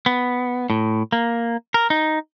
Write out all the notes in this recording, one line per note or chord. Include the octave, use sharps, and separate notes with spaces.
B3
A2
A#3
A#4
D#4